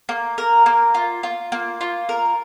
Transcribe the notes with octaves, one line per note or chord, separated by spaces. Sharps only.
A#3
A#4
A#3
F4
F4
A#3
F4
A#4